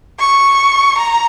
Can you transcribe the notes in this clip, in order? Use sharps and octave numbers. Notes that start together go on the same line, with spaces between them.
C#6
A#5